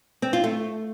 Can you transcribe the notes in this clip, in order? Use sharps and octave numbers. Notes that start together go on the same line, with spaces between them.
C4
F4
A3